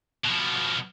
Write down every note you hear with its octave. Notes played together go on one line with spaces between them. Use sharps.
B2 F3